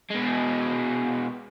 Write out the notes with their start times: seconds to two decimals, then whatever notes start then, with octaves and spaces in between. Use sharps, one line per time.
0.11 B2 G#3